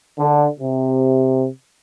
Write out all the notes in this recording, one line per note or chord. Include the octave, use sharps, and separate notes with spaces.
D3
C3